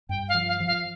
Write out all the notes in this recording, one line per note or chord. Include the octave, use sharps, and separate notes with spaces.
G2 G5
F5
F3
F5
F3
F5